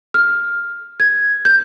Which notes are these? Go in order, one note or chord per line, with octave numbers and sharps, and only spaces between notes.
F6
G#6
G6